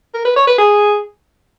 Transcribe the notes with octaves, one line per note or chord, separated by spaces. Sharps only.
A#4
B4
C#5
B4
G#4